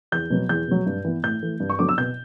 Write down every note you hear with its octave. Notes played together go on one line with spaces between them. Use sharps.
E2 G6
B2 F#3 B3
E2 G6
B2 F#3
G2
E3 B3
A2 G6
E3 A3
G2
C#6
D3 F#3 B3 D6
E6
B2 G6